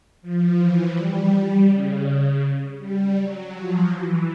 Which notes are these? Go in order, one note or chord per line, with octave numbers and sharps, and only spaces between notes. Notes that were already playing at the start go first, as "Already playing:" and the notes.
F3
E3
G3
C#3
C#3
G3
F#3
F3
E3